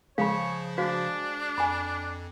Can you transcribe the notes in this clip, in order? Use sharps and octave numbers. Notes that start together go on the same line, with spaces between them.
C#3 F3 G#3 C#5 F5 B5
D4 F#4 C5 F5
F2 G#5 B5